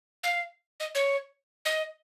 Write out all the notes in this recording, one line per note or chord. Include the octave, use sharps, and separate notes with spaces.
F5
D#5
C#5
D#5